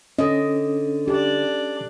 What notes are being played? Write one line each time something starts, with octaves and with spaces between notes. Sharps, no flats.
D3 C#4 D#5
D4 G4 D5